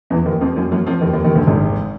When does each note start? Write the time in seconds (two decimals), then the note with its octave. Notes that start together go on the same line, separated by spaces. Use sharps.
0.10 E2 E3
0.26 D#2 D#3
0.41 F2 F3
0.56 F#2 F#3
0.71 F#2 F#3
0.87 F2 F3
1.01 D#2 D#3
1.13 D#2 D#3
1.24 D#2 D#3
1.35 D2 D3
1.47 G#1 G#2